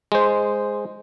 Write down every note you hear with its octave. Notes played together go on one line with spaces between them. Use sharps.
G#3 C5